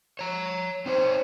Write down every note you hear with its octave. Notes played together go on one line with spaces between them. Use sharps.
C#5 A#5
C4 D#4 C5 C#5